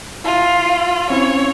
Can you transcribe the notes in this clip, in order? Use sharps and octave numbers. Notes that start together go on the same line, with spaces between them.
E4 F4 E5 D#7
C4 C#4 E4 C#5